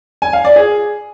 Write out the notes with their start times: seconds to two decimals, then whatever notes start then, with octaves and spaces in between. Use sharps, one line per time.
0.22 G#5
0.33 F5
0.45 D5
0.56 G#4